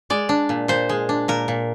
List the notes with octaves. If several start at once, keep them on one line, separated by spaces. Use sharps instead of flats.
G#3 D5
D4
A#2
A#2 C5
G#3
D4
A#2 A#4
A#2